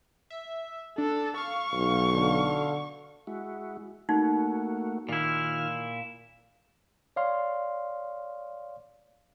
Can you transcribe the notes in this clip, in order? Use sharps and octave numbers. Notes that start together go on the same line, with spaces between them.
E5
D4 A4
F5 C#6
B1
D3
G#3 E4 F#4
A3 A#3 D#4 F#4
A#2 D#3 E4 F4 F6
C#5 D5 F5 C6